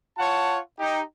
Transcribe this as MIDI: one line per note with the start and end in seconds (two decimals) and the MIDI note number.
0.18 0.58 65
0.18 0.58 73
0.18 0.58 78
0.18 0.58 81
0.79 1.00 63
0.79 1.00 67